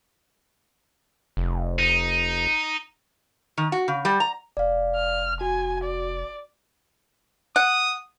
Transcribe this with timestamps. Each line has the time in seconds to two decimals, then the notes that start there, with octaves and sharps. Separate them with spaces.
1.37 F1
1.79 D#4
3.58 D#3
3.72 F#4
3.88 C#3
4.05 G3
4.20 A#5
4.57 F1 D5 F5
4.96 F6
5.41 F#4 G#5
5.84 D5
7.56 F#5 D#6